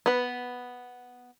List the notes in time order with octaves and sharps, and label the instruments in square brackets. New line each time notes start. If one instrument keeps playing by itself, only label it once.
[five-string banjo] B3 B4